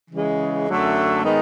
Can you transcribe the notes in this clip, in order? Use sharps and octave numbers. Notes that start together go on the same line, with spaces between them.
C#3 E3 G#3
F#2 D3 F#3 A3
D#3 G#3 B3 D#4